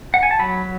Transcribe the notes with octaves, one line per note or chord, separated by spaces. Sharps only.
F#5
G#5
A5
F#3 B5